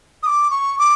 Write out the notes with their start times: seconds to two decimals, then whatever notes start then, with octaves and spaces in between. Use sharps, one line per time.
0.23 D#6
0.27 D6
0.50 C#6
0.79 D6